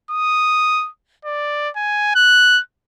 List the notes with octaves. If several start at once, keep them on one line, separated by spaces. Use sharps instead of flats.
D#6
D5
G#5
F#6